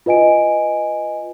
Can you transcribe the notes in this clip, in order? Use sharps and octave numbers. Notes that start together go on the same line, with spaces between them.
F4 B4 D#5 G#5 D7